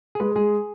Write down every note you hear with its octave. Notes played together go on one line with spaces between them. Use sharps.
G#4
G#3 B4
G#3 G#4